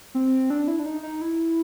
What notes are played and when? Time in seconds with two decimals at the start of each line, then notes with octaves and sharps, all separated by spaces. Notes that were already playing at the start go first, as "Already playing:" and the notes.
0.15 C4
0.50 D4
0.68 E4
0.79 D4
0.86 D#4
1.03 D#4
1.21 E4